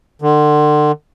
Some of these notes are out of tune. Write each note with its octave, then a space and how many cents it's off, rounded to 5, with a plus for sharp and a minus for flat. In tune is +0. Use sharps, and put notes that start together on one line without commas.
D3 +35